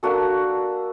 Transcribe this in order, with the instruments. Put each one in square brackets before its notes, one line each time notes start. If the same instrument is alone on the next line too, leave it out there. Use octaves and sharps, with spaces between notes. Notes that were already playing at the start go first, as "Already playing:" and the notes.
[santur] A#3 D4 F#4 A4